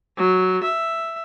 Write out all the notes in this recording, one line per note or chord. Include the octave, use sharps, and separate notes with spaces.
F#3
E5